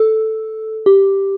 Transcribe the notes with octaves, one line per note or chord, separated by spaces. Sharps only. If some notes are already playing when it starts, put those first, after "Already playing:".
Already playing: A4
G4